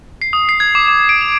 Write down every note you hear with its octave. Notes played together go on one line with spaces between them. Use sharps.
C7
D#6
C7
G#6
D6
D6
D7
F7